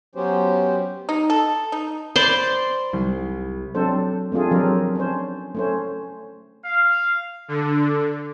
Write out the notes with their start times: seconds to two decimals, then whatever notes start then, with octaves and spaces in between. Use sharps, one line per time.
0.15 F#3 B3 C#4 G4 C5
1.09 D#4
1.30 A4
1.72 D#4
2.16 C5 D5 B5 C6
2.93 C2
3.75 F#3 C4 D4 A4 C5
4.32 A3 C4 D4 F4 G#4
4.51 F3 F#3 C4 D4 G4 A#4
4.95 C#4 D4 C5
5.55 A3 C#4 C5
6.64 F5
7.48 D3